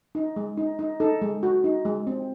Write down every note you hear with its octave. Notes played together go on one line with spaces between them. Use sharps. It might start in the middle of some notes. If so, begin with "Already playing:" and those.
D#4
G#3
D#4
D#4
D#4 A4
G#3
F#4
D#4
G#3
C4